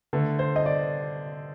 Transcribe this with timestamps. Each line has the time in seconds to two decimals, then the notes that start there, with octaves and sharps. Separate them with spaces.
0.13 D3 A3
0.39 C5
0.56 D#5
0.66 D5